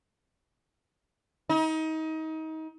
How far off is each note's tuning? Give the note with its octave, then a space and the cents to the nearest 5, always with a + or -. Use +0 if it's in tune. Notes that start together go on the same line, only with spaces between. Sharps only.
D#4 +30